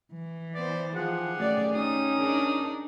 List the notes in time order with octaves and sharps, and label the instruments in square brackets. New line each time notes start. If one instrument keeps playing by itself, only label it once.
[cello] E3
[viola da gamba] B3 C5 [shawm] D5
[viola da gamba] D#3 G4 G#4 [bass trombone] F3 [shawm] F#5
[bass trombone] F#2 [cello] A3 D5
[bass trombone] C#4 [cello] D#4 [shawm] D#6
[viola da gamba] D4 G#4 A#4